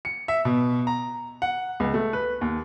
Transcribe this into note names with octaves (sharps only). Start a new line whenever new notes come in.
C#7
E5
B2
A#5
F#5
C#2
A3
B4
D#2